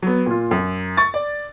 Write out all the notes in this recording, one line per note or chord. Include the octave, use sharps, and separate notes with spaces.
F#3 B3
A#2 F4
F#2
C#6 A6
D5